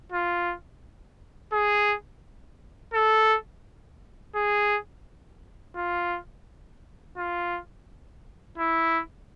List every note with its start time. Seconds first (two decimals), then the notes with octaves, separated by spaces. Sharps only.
0.12 F4
1.52 G#4
2.94 A4
4.35 G#4
5.76 F4
7.17 F4
8.58 E4